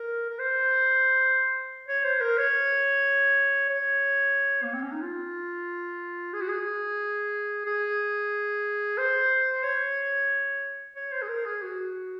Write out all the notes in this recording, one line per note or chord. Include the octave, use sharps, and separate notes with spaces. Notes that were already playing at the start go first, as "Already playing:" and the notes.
Already playing: A#4
A#4
C5
C#5
C5
A#4
C#5
C#5
A#3
C4
C#4
D#4
F4
G#4
F#4
G#4
G#4
C5
C#5
C#5
C5
G#4
A#4
G#4
F#4